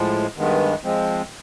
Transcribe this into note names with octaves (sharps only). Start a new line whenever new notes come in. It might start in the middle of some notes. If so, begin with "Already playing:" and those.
Already playing: A2 F3 G#3
G2 D#3 G#3 B3
F3 G#3 C4